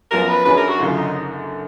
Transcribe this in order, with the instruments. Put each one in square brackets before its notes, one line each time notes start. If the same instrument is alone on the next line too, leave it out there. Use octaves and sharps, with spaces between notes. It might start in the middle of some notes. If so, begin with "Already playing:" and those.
[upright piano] F#2 F3 B3 [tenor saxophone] A#4
[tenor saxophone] B4
[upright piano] F#2 D#3 F#3 D4 G#4 [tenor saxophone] B4
[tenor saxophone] A#4
F#4
[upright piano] F#1 F#2 D3 [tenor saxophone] F4
[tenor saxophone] D#4